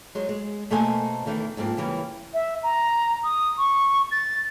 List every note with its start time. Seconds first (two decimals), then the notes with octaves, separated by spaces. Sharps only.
0.15 F#3 G#3 C5
0.29 G#3
0.70 B2 A3 A#3 A4 C5 G#5
1.26 E2 D#3 E3 A3
1.57 F2 G#2 A#3 C4
1.77 C#3 E3 G3 A#3
2.34 E5
2.63 A#5
3.24 D#6
3.58 C#6
4.11 A6